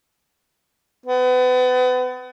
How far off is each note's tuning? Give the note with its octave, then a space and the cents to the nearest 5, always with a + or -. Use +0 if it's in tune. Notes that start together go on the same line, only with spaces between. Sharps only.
B3 +35